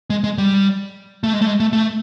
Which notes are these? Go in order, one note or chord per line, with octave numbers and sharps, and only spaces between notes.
G#3
G#3
G3
A3
G#3
A3
G#3
A3
A3